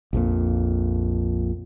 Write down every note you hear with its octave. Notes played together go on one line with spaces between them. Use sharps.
A#1 F2 A#2